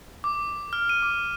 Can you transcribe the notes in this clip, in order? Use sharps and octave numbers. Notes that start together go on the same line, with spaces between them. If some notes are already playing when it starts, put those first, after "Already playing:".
D6
F6
D#7
D6